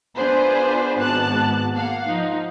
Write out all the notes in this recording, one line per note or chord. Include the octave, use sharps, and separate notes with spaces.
B3 D4 F4 G#4 B4 C5
G#1 G#2 B3 A5 F#6
A#3 F5 F#5
F3 D#4